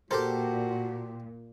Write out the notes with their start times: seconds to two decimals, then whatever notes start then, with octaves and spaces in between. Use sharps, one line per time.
0.11 A#2 F#4 G4 A4 A#4 C5